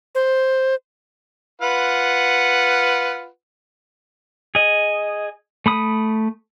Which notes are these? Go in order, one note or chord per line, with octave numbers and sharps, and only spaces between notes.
C5
F4 B4 F#5
G#4 D#5
A3 B5 D#6